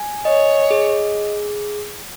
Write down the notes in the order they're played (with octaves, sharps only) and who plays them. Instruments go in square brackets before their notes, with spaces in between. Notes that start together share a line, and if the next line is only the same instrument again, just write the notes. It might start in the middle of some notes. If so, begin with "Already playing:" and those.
Already playing: [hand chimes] G#5
[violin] C#5 [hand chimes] D#5
[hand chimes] G#4